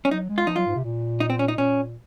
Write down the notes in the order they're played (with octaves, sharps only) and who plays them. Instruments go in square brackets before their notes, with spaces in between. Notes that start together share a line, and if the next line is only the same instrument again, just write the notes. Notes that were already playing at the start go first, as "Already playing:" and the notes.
[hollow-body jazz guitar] C#4
[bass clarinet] F#3 [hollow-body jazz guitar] D#4
[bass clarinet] G#3
[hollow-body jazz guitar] F4
[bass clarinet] F3 [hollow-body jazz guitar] D#4
[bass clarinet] F#3 [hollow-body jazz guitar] F4
[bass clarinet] G#2
C3
A#2
[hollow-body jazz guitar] D#4
C4
C#4
D#4
[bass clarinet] A#2 [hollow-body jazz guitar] C#4